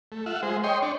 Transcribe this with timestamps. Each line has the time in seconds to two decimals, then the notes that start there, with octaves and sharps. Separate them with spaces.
0.12 A3
0.26 F4 E5 F#5
0.43 G#3 C5
0.64 C#5 D#5 G5 C6
0.82 D4 C#5